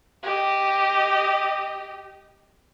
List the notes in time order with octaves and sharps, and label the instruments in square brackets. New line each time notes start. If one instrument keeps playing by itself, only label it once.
[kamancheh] G4 D#5